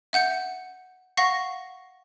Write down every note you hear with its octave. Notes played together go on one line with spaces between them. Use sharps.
E5 F#5 G6 C#7
F5 F#5 C#6 A#6